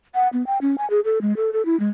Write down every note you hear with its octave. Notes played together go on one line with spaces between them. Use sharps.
F#5
B3
G5
C#4
G#5
G#4
A4
G#3
A4
A4
E4
G#3